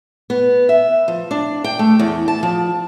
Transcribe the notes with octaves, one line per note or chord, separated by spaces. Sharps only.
B3
E5
F3
D4
G5
A3
E2
A5
F3